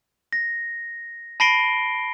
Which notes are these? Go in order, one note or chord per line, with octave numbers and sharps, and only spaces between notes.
A#6
A5 B5 A#6 C7 D7 G7